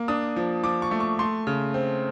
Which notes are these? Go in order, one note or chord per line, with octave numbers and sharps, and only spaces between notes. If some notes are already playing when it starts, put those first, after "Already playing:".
Already playing: A#3
D4 D#6
F3
F3 D6
C#6
A3
C#6
A3 C6
C#3
C4